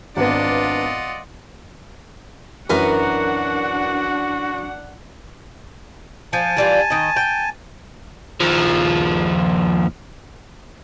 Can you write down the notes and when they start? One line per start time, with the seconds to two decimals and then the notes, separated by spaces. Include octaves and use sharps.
0.17 G#1 B3 D4 F4 D5 D#5 F#5
2.70 F#2 E3 D4 F#4 A#4 B4 F#5
6.33 F3 G#5 A5
6.57 E3 G3 F4
6.90 D#3 D#5
7.16 G5
8.41 D#2 F3